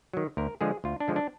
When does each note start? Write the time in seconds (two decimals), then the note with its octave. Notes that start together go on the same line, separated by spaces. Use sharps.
0.13 D#3 F#3
0.37 D2 A#4
0.61 D3 F3 G#3 G#4
0.84 D2 F4
1.00 D4
1.08 D3 F3 G#3
1.16 D4